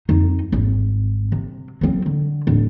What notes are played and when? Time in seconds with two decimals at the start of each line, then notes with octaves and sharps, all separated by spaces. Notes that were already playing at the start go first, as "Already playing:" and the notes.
0.09 F2 D#4
0.52 G#1
1.32 C3
1.81 F#3 C4
2.06 D3
2.47 D1